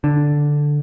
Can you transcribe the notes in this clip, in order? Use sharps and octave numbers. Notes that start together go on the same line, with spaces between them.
D3